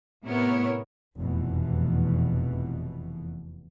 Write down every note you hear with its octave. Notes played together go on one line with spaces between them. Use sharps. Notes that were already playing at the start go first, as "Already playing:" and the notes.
A2 C3 B3 E4 A#4 C#5
F1 E2 B2 E3